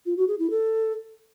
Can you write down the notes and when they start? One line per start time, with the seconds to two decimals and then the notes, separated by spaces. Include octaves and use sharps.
0.06 F4
0.17 F#4
0.28 G#4
0.39 E4
0.50 A4